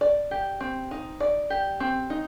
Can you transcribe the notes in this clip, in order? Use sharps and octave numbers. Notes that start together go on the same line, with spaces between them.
D5
G4
C4
D#4
D5
G4
C4
D#4